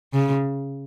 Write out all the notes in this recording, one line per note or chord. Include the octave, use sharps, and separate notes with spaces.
C#3